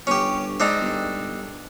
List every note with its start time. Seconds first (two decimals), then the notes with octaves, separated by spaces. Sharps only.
0.07 G1 C#4 G4
0.60 G#2 C4 D4 D#4
0.82 G1